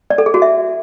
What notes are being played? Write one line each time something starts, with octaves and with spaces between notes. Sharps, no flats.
D5
A4
G#4
F#4
E5